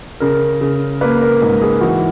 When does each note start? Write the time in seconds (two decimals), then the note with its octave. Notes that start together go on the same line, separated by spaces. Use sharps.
0.20 C#3 A#4
0.61 C#3
1.01 A#3 B4
1.22 A#4
1.41 G#2 A#4
1.62 G#4
1.81 E3 F#4